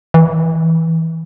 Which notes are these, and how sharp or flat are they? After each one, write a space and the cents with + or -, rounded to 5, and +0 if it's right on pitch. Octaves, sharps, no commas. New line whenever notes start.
E3 -20